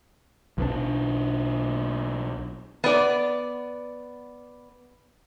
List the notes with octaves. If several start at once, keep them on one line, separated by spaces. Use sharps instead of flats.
B1 B2 D4
B3 D5